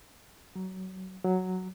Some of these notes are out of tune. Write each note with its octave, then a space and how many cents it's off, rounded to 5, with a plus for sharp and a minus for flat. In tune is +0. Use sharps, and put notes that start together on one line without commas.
F#3 +20
F#3 +0